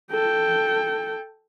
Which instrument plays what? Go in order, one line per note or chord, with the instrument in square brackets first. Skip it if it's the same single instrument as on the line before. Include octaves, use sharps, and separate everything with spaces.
[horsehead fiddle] A4 G5